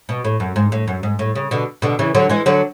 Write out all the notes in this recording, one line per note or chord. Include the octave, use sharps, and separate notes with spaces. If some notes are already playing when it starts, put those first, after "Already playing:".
B2
A2
F#2
G#2
A2
F#2
G#2
A2
C#3
B2 D3
B2 D3
C#3 E3
D3 F#3
E3 G#3
D3 F#3